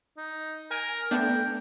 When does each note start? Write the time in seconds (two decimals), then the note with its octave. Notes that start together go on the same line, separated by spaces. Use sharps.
0.17 D#4
0.71 A#4 G#5
1.11 A3 B3 D4 G5